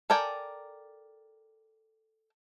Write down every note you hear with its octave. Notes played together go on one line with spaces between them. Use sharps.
A4 A#4 D5 G5 G#5